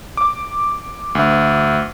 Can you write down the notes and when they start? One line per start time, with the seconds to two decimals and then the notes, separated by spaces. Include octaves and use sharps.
0.17 D6
1.15 D2